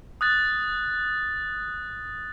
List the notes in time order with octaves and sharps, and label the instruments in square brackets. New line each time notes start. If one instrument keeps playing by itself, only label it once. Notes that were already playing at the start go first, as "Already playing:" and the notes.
[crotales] D#6 F#6 A6